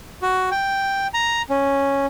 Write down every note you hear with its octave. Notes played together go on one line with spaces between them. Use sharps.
F#4
G5
A#5
C#4